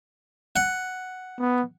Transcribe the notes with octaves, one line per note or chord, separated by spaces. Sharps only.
F#5
B3